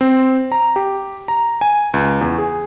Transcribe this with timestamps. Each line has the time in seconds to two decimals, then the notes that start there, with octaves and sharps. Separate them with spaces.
0.01 C4
0.52 A#5
0.76 G4
1.28 A#5
1.61 G#5
1.94 C#2
2.21 E2
2.38 G#4